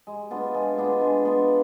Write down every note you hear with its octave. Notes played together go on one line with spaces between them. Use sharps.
G#3
B3 D4 F4
G#3
B3 D4 F4
G#3
B3 D4 F4